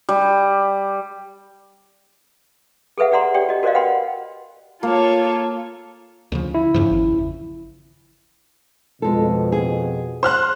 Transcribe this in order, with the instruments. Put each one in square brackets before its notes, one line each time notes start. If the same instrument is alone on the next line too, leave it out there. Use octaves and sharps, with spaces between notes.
[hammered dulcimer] G3
[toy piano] G#4 A4 B4 E5 F#5
G4 G#4 D5 F#5 A#5 C6
G4 C#5 D5 G5
F#4 D#5
F#4 A#4 C5 D5 D#5 F5
B4 F#5 G5 B5 C6
[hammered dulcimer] A#3 [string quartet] F4 A4 C#5
[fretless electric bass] D2 C#3 F3
[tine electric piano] E4
[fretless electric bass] E2 C#3 F3 [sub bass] G2
[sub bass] G#1
[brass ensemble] F2 B2 [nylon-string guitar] G#3 A4
[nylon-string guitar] G#4
[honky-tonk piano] C5 F6 F#6